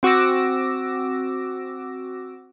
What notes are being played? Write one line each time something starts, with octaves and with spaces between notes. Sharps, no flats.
C4 F#4 D6 E6 A#6